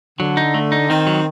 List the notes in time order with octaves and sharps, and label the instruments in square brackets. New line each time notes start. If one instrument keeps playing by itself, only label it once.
[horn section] D3 [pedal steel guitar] F#3
[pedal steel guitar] D#4
A3
D#4
[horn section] D#3 [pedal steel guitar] C4
[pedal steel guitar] F#3